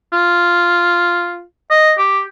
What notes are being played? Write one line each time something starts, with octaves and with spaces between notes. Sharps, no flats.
F4
D#5
G4